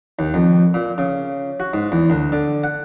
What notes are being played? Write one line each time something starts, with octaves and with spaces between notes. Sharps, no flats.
D#2
F2
A#2
C#3
F#4
G#2
E2
D2
D3
F#5